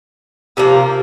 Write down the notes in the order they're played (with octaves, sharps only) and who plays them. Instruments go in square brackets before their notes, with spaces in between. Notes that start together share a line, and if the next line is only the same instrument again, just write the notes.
[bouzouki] C3 F3 A#3